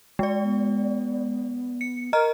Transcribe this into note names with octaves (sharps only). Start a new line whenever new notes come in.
G#3 D5
B3
C#7
A#4 D#5 A#5 F6